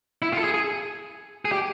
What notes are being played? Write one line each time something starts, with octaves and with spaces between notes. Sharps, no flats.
E4
F4
A4
G#4
G#4
G#4
G4